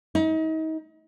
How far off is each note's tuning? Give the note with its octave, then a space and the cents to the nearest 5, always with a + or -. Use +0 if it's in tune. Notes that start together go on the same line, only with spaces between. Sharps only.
D#4 +35